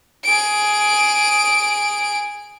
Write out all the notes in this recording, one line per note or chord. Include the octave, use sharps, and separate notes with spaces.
G#4 D7